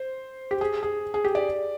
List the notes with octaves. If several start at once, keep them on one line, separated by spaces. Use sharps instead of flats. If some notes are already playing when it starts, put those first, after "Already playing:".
Already playing: C5
G4
G#4
G#4
G#4
G4
D5